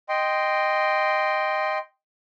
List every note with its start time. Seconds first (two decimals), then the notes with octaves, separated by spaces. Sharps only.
0.09 D#5 G5 C6